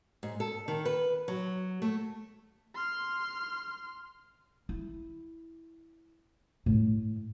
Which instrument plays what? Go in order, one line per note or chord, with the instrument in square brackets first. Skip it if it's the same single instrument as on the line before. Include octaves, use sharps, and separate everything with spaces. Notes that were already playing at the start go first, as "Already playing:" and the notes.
[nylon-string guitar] G#2
A4
D#3
B4
F#3
A3
[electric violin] C6 F6
[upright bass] E4
A2